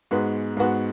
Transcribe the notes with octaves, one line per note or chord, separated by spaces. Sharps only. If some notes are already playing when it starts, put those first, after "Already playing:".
G#2 G#3 B3 F#4
G#2 G#3 B3 F#4